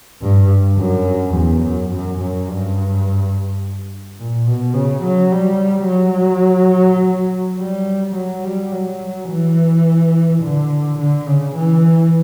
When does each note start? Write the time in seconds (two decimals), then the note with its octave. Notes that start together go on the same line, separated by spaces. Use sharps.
0.21 G2
0.78 F#2
1.34 E2
1.64 F#2
1.92 F#2
2.21 F#2
2.48 G2
4.18 A#2
4.47 B2
4.75 C#3
5.03 F#3
5.31 G3
5.88 F#3
7.59 G3
8.15 F#3
8.44 G3
8.72 F#3
9.29 E3
10.43 D3
10.99 D3
11.27 C#3
11.56 E3